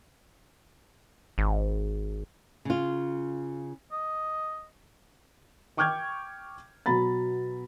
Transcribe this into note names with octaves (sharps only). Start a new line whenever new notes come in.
G#1
C#3 F4
D#5
G5 C#6 D6 F6 G6 G#6
B2 F#3 A#5 B5 A6